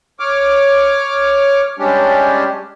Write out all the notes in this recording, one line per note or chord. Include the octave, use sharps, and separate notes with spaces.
C#5 D6 F6
G3 G#3 C#4 D4 G4